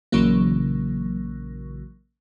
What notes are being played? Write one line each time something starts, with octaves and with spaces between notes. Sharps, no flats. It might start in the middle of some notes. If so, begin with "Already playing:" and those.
A#1 C#3 E3 F#3 A#3